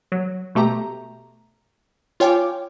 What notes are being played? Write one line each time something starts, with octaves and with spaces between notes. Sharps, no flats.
F#3
B2 A3 G4 A#5
F4 C#5 G5 G#5 D6